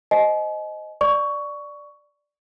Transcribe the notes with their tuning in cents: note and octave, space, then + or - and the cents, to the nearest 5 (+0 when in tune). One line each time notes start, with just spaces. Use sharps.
C5 +0 D#5 +0 G#5 +40
D5 +0 C#6 +15